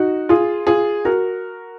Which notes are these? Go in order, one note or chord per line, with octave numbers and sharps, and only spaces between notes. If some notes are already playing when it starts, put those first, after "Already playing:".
Already playing: D#4 F#4
F4 G#4
F4 G#4
F#4 A#4